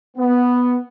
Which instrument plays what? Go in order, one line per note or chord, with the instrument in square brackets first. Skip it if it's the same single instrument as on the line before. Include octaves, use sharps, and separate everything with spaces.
[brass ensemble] B3